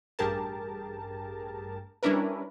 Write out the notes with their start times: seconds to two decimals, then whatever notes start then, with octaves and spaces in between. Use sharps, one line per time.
0.19 A1 G2 G4 G#4 A#4 A5
2.03 G3 C#4 D4 E4 A#4 B4